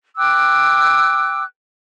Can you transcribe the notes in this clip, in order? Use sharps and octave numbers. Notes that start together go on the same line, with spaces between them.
G5 D6 E6 F#6